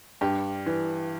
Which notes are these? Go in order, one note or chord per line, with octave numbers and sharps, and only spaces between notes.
G2 G4
E3